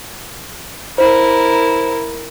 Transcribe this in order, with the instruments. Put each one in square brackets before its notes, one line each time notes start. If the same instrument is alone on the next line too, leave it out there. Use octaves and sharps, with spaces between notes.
[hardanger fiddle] E4 A#4 [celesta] C5